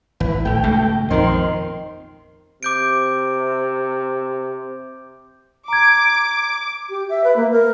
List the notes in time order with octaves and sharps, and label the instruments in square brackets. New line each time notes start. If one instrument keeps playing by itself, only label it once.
[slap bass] G#1 [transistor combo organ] E3 B4
[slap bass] A#1 A2 [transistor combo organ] A3 G5
[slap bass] C#2 G2 B2
[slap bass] A#1 F2 F3 [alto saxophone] D#3 [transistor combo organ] C4 C6
[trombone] C3 [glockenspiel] D6 G6 D7
[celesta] A#5 G#6 [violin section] D6
[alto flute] G4
E5
B4
A#3
A#4